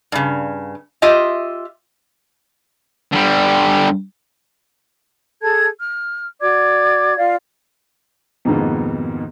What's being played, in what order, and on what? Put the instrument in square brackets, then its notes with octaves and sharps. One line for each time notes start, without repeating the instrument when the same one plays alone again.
[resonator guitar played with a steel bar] G2 C#3
F4 G4 D#5 E5
[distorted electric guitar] D3 G3
[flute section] G#4 A4 A5 G#6
F6
F#4 D5 D6 G#6
F4 D5 F5
[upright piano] F2 G#2 B2 D#3 A#3 B3